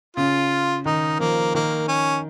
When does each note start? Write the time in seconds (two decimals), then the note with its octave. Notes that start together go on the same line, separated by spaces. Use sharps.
0.16 C#3 F4
0.86 D#3 D#4
1.20 F3 A#3
1.55 D#3 A#3
1.88 C#4